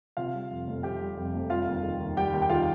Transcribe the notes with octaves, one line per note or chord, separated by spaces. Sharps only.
C3 F4 F5
G3
F2
F1
C3 G4 G5
G3
F2
F1
G3 F4 F5
D#2
D#3
D#2
G3 G4 G5
D#2
G5
D#3 F4 F5